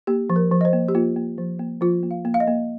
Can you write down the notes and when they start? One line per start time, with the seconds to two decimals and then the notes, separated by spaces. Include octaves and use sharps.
0.07 A#3 G4
0.30 F3
0.36 A#4
0.51 F3
0.61 D#5
0.65 C5
0.73 A#3
0.88 G4
0.95 A#3 F4
1.16 A#3
1.38 F3
1.59 A#3
1.81 F3 F4
2.03 A#3
2.11 F5
2.25 A#3
2.34 F5
2.40 D#5
2.47 A#3